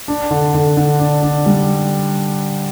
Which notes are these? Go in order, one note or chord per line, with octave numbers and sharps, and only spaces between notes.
D4
D3
D3
D3
D4
D4
G3